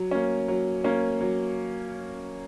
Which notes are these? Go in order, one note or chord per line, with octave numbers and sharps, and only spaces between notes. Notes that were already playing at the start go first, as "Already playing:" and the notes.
Already playing: F#3
A#3 C#4
F#3
A#3 C#4
F#3